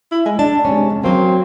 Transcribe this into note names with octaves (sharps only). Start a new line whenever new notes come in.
E4
G#3
D4 A5
C3 G#3 C#4
F2
F#3 A#3 C4